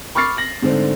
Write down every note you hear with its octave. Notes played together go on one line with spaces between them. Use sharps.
B5 C#6 D6 F6 A6 C7
A#6 F#7
G#2 D3 A3 C4 D4